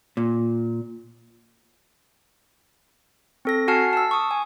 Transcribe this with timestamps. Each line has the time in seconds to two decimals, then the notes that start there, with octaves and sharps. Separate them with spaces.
0.17 A#2
3.45 C4 A4 A#6
3.68 F#4 F#5 G#5 A5 F6 C7
3.93 A5 E6
4.11 C#6 D#6
4.31 G#5